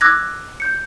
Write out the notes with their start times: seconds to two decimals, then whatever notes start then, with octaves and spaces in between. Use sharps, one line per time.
0.01 D6 E6 F#6 G#6 A#6
0.60 G6 C#7